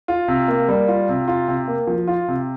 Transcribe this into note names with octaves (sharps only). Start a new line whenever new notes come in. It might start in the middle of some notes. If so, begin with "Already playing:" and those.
F4
C3
A#3
G3
F4
C3
F4
C3
A#3
F3
F4
C3